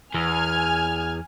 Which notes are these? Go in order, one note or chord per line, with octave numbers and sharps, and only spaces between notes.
E2 G#5 F6 G#6